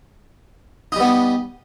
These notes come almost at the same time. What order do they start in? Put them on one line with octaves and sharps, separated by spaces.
D#4 G3 B3